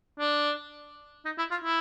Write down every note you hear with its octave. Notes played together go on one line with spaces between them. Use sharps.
D4
D#4
E4
F4
E4